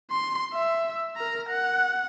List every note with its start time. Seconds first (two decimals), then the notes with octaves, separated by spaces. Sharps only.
0.11 C6
0.53 E5
1.16 A#4 A#5
1.50 F#5